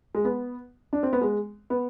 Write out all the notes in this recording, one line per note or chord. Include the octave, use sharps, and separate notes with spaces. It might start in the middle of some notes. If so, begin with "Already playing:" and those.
G#3
B3
D4
C4
B3
G#3
B3